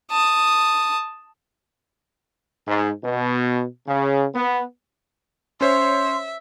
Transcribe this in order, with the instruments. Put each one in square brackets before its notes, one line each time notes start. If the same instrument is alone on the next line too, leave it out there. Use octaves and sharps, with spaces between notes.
[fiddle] A5 D#6
[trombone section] G#2
B2
C#3
B3
[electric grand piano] C#4 C5 C#5 [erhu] E5 [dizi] C6